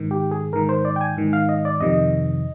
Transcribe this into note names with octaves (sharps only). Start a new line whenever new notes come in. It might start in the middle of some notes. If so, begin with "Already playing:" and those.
Already playing: G#2 D#3
G4
G#4
G#2 D#3 A#4
C5
D5
G5
G#5
G#2 D#3
F5
D#5
D5
F2 C3 D#3 D#5